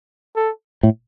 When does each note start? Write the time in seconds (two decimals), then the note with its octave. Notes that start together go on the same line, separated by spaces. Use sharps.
0.36 A4
0.83 A2